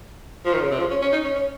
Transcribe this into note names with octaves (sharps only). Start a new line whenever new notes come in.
F3
D#3
C#3
C3
F3
C#4
C#4
D#4
C#4
C#4